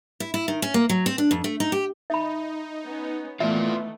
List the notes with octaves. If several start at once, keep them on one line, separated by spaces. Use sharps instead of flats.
E4
E4
D#3
C#4
A#3
F#3
C4
D4
F2
A3
D#4
G4
D#4 E5 B5
B3 C#4
D#3 E3 A3 B3 F4 D5 E5